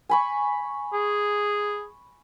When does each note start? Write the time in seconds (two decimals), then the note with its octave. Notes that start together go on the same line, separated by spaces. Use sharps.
0.09 G#5 B5 C#6
0.93 G#4